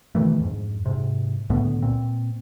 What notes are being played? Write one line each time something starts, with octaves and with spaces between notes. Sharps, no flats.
B2 D#3 E3 A3
F2 G#2
G#2 C3
C#2 A2 D3 B3
A#2 C4